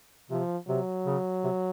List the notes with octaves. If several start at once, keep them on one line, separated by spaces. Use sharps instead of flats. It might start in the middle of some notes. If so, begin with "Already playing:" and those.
C3 F3
C3 F#3
C#3
C3